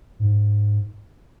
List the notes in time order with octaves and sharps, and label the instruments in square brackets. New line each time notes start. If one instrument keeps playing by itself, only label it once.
[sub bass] G#2